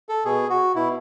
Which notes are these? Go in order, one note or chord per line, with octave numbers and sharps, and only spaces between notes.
A4
B2 G#4
F#4
B2 E4